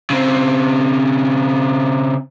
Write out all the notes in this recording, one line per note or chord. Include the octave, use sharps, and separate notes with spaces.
C#3 C4